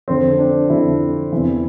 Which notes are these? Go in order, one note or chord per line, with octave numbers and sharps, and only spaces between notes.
F2 D3 C4
D4
F2 D3 E4
E2 C3 E3